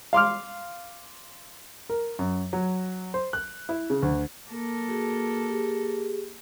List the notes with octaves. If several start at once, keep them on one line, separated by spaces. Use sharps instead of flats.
F5 C6 D6 F6
A#4
F#2
F#3
C5
F#6
E4
C#3
D2
A#3 A4
F#4 G#4
G4 G#4